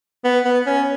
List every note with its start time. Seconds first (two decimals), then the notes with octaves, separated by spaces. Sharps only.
0.24 B3
0.45 B3
0.66 C#4